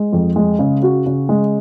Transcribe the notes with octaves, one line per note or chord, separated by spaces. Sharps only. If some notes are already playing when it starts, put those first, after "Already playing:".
Already playing: G#3
F2
G#3
C#3
F#4
C#3
G#3